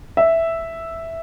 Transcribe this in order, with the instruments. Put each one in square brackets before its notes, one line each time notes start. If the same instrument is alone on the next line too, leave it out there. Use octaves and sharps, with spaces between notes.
[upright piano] E5